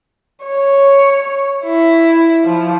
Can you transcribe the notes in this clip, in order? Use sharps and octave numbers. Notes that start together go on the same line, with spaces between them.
C#5
E4
F3